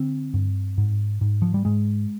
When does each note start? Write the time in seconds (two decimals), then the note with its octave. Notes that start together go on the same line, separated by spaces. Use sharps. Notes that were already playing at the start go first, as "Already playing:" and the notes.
Already playing: D3 C4
0.34 G2
0.78 G#2
1.21 G#2
1.42 F3
1.54 G3
1.65 G#2 G#3